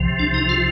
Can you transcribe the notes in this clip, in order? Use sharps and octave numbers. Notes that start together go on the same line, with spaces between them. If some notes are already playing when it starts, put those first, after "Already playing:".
Already playing: C2 C3 F3
D4
D#4
F4